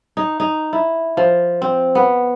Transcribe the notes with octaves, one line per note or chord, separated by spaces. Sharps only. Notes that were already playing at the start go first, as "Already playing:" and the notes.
D#4
D#4
E4
F3
C4
B3